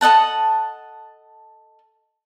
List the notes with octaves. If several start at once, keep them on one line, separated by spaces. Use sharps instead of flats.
A4 D#5 F#5 A5